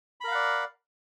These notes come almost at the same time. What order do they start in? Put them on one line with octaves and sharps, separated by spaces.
B5 A#4 F5 F#5 D5